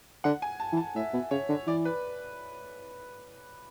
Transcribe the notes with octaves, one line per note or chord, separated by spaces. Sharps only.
D3 F#5
G#5
A5
E3
A5
A2 E5
B2
C#3 C#5
D3
E3 D5
B4